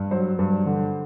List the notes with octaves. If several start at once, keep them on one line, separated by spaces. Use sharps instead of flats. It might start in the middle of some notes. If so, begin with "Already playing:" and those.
Already playing: G2
F#3 C5
G2
D3